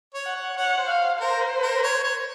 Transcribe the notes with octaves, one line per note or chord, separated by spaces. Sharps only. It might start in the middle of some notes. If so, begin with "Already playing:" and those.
C#5
F#5
C#5
C#5 F#5
C5
F5
A#4 C5
A#4
C#5
C#5